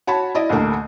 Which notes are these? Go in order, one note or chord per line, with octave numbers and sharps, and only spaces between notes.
F#4 C#5 A5 B5
E4 D5 D#5
A1 D2 D3 A3 A#3